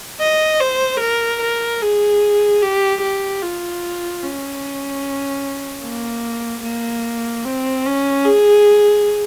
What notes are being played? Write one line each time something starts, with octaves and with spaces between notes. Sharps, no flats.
D#5
C5
A#4
A#4
G#4
G4
G4
F4
C#4
A#3
A#3
C4
C#4
G#4